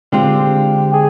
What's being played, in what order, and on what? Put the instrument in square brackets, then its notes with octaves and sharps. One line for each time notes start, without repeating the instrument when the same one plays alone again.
[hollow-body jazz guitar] D3 G#3 C4 F4 [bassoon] G4
[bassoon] G#4